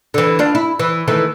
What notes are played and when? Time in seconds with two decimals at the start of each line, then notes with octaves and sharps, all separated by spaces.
0.14 D3 E3
0.39 D4 F4
0.55 E4
0.79 E3
1.08 D#3 E3 A3